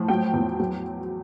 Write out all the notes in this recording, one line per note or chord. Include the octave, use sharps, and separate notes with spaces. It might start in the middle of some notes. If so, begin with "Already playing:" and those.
Already playing: A2 F3
F#3 G5
E2
F#3